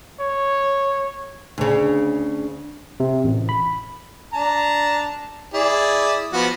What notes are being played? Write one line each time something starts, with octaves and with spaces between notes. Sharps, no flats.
C#5
D2 C#3
C3
A1
B5
D4 A5 A#5
E4 G#4 D5
F3 B3 F#4